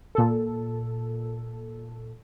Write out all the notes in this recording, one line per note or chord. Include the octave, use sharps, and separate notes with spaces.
A#2 A4